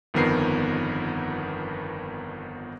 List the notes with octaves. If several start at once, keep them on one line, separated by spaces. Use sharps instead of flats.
G1 F2 D#3 B3 A#4 C7